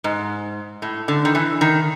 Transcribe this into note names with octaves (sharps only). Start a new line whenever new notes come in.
G#2
A2
D3
D#3
E3
D#3